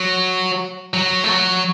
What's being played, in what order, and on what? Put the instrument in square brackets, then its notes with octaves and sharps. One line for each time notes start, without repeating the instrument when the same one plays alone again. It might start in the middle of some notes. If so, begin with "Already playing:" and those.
Already playing: [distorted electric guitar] F#3
F#3
A3
F#3